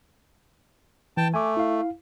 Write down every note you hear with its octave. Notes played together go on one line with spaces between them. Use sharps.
E3 G5 A5
A3 G#5 D6
E4 F5